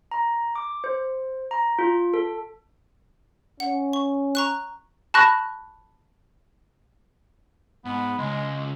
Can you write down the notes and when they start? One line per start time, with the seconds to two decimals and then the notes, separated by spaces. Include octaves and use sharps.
0.11 A#5
0.55 D6
0.84 C5
1.51 A#5
1.79 F4
2.14 A4
3.60 C#4 F#5
3.93 C#6
4.35 A#5 C#6 F#6
5.14 A5 B5 C#6 F#6 A#6
7.85 G#2 B3
8.18 C#2 G#3